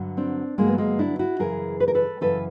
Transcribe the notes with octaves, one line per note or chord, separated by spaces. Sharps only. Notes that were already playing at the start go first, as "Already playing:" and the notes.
Already playing: G2 D3 F#3
C4 D4
G2 D3 F#3 G#3 A#3
B3
G#3 A#3
D4 E4
E4 F#4
F#2 C#3 E3 G#4 A#4
B4
A#4
A4 B4
F#2 C#3 E3 A4 B4